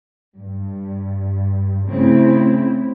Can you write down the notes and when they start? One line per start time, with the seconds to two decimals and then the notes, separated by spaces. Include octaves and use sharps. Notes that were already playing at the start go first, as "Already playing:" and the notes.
0.36 G2
1.88 C#3 A3 C4 E4